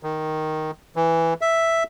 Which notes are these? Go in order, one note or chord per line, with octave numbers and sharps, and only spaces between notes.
D#3
E3
E5